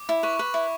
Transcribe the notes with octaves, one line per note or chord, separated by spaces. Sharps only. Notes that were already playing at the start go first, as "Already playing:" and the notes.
Already playing: D6
E4
B4 C#6
C#6
B4
E4